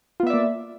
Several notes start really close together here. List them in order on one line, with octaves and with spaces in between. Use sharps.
F4 B3 E5 D5 A#3